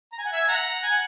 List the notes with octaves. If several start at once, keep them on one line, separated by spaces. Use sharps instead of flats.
A#5
G#5
F#5
E5 G#5
F#5 A#5
G#5
F#5